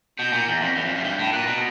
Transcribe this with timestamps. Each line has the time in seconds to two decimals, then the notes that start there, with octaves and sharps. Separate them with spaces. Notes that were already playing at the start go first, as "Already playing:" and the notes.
0.19 B2 G6
0.33 A#2
0.47 E2
0.61 F2
0.76 E2
0.86 F2
0.95 F#2
1.04 G2 G6
1.19 A2
1.32 A#2 F#6
1.47 B2